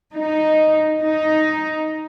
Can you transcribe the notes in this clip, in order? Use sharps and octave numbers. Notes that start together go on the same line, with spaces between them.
D#4
D#4